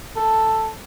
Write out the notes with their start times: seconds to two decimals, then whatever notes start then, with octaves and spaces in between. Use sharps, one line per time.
0.17 A4